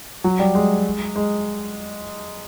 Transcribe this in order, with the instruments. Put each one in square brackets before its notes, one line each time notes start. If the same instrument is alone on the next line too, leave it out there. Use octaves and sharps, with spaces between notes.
[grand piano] F#3
G3
G#3
G#3